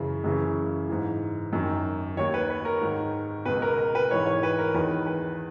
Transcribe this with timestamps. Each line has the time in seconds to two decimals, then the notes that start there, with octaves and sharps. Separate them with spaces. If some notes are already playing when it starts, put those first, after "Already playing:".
Already playing: F#2 C#3 E3
0.24 F#2 C#3 E3
0.89 G#2 E3
1.53 F#2 D#3
2.17 D#2 D#3 C#5
2.34 B4
2.50 B4
2.65 A#4
2.81 G#2 D#3
3.45 C#2 B2 B4
3.62 A#4
3.78 A#4
3.95 B4
4.11 G#2 E3 C#5
4.26 C#5
4.43 B4
4.58 A#4
4.74 E2 D#3 B4
5.06 B4